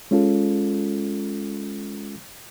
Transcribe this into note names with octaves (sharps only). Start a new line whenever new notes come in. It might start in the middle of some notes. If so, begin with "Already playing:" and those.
G#3 C#4 F4 A4